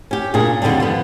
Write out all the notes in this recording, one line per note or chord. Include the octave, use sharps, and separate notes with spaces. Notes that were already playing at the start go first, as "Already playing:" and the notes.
C#4 G4
A#2 C#3 D4 G#4
D#2 D3 G3 C4 D4
F3 B3